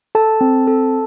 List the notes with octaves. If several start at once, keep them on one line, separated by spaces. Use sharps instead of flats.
A4 A5
C4
A4